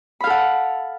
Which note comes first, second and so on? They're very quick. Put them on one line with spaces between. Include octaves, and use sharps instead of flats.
B5 F5 A4 F#5